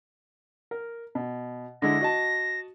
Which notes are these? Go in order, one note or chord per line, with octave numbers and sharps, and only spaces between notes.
A#4
B2
D3 G#3 E4 A#6
F#4 D#5 A5